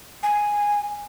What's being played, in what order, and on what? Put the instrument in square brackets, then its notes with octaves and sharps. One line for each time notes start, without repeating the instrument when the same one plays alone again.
[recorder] G#5